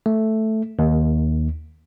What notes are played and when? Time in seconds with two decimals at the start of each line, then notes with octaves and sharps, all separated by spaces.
0.06 A3
0.79 D#2